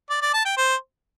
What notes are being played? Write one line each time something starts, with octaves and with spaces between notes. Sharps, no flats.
D5
D5
A5
G5
C5